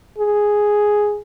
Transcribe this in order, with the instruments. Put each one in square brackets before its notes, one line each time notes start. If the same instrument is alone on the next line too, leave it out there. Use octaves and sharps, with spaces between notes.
[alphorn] G#4